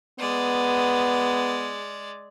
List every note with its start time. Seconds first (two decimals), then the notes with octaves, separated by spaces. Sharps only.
0.19 G#3 B3 D5